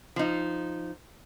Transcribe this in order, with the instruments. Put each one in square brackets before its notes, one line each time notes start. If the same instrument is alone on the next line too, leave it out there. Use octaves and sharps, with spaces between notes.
[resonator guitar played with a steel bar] F3 D#4